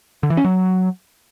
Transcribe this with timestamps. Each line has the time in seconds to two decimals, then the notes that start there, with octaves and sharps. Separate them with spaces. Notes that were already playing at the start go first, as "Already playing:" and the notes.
0.23 D3
0.30 E3
0.37 C#4
0.44 F#3